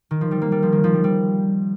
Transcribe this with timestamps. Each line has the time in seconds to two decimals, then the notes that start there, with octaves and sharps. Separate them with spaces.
0.11 D#3
0.21 F3
0.31 G3
0.42 A#3
0.52 G3
0.63 F3
0.72 D#3
0.84 F3
0.94 G3
1.04 G3